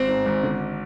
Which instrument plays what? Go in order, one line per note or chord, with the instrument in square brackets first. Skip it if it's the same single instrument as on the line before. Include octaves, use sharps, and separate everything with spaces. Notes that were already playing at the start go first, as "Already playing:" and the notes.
Already playing: [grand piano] G#1 C4
G#2
G#1
D3